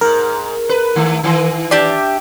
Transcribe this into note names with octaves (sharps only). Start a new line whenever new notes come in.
G#2 A#4
B4
D#3 A3
D#3 E3
D4 G4 D5 E5